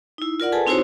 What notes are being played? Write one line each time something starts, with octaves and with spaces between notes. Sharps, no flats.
D#4 E4
F4 A#4 D5 F#5
G#4 A4 B4 G#5 A5
C4 D#4 E4 F#4 C5 C#5